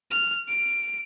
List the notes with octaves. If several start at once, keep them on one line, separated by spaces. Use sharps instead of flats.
F6
D7